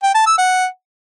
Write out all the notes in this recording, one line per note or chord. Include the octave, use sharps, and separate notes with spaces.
G5
A5
E6
F#5